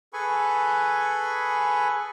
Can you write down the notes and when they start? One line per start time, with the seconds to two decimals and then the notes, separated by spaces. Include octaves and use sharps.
0.13 G#4 A4 B4 G#5 B5 C#6